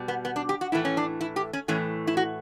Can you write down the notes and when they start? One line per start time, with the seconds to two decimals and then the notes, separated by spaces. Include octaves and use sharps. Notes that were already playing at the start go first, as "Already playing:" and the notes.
Already playing: B2 G3
0.08 B3
0.25 B3
0.36 D4
0.49 G4
0.61 F#4
0.72 A2 E3 A3 E4
0.85 C#4
0.97 D4
1.21 E4
1.36 G4
1.53 C#4
1.68 A2 E3 A3 C#4
2.07 E4
2.17 F#4